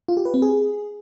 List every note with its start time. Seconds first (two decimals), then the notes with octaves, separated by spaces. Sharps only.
0.08 F4
0.17 G4
0.25 B4
0.34 C4
0.42 G#4